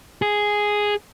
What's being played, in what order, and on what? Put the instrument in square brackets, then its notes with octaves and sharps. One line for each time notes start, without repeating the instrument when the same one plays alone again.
[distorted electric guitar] G#4